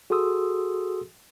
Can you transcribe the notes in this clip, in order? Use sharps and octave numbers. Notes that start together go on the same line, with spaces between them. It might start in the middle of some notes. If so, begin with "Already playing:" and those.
F#4 G#4 A4 C6 D#6 E6